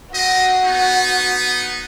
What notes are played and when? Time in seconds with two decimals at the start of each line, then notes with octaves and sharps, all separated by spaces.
0.14 C4 F#4 D#5
0.65 B3 D#4